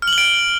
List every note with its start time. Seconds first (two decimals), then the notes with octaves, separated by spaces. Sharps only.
0.02 F6
0.08 F#7
0.13 G7
0.18 D7